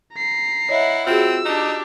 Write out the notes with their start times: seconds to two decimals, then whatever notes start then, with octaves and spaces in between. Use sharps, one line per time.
0.14 A#5 C7
0.69 E4 C#5 D#5 E5 F#5
1.07 C4 F4 F#4 G#4 E6
1.45 D4 D#4 G4